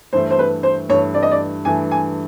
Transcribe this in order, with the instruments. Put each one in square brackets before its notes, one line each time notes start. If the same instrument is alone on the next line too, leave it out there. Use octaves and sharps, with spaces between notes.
[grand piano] G2 E3 A3 [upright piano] C5
[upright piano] C5
B4
C5
[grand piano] G2 E3 A3 [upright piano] C#5
[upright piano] D5
D#5
D5
[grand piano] G2 E3 A3 [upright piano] G#5
[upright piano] G#5